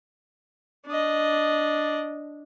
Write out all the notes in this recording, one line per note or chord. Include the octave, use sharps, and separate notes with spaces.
D4 D#5